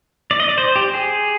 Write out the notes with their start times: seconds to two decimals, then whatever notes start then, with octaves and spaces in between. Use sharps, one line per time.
0.31 D5
0.40 D#5
0.49 D5
0.58 C5
0.76 G4
0.94 G#4